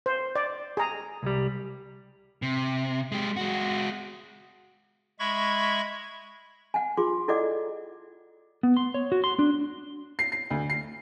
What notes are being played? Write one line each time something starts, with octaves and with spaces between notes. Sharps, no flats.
C5
D5
G#4 A#5
C2 G3
C3
G#3 G4
G#3 F#4
G#3 E5 B5 C#6 G#6
F#5 G#5
F4 G#4 C6 D6
E4 A4 D5 D#5 F#5 D6
B3
C6
C#5
F#4
C6
D4
C7
C7
D2
C7